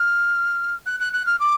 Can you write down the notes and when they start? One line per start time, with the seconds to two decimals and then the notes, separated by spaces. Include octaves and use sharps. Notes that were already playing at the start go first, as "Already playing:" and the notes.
Already playing: F6
0.86 F#6
1.00 F#6
1.13 F#6
1.26 F6
1.39 D6